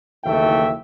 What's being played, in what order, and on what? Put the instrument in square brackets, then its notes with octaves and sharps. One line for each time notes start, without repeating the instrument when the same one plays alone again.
[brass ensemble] F#1 D#2 E3 A3 E5 G5